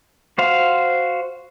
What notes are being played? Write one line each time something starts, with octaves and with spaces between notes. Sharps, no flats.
F#4 C5 F5